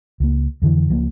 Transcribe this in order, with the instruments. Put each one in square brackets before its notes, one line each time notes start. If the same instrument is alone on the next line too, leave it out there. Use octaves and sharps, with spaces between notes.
[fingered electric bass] C#2 A#3
F2 D3 E3
C#2 F3 G#3 A#3